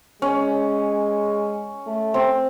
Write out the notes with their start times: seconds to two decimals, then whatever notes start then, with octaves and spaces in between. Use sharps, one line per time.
0.22 G#3 C#4
1.87 A3
2.14 C4